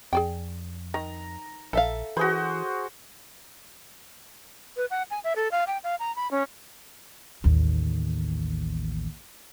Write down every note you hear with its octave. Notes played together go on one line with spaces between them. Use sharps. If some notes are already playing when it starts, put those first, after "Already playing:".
F2 G#4 D5 G5
D#3 A#5
A#1 A4 E5 F5
E3 F#4 G#4 B4 C5
B4
F#5
G#5
E5
A4
F5
G5
F5
A#5
B5
C#4
A1 D#2